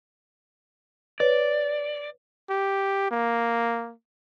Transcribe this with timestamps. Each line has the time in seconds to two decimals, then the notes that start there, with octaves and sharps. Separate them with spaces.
1.20 B4 C#5 D5
2.50 G4
3.11 A#3